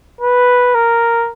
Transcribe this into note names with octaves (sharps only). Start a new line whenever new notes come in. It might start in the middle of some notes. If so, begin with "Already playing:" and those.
B4
A#4